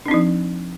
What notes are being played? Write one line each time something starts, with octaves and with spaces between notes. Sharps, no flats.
F3 C4 D4 D#4